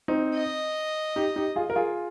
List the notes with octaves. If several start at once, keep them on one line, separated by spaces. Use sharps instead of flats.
C4 D#4
D#5
D#4 G4
D#4 G4
F4 G#4
A#4
F4 G#4